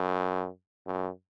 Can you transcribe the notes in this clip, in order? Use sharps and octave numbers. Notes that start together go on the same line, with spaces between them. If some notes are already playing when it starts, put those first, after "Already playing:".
Already playing: F#2
F#2